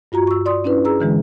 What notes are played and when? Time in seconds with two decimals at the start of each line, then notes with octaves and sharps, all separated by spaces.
0.12 G2 F4 F#4 A#5
0.27 C#6 E6
0.46 D5 C6 D#6
0.64 C#4 D4 E4 B4
0.85 G#4 A#5 E6
1.00 D3 E3 G#3